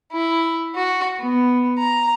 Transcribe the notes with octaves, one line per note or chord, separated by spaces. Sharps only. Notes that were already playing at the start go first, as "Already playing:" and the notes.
E4
F#4
B3
A#5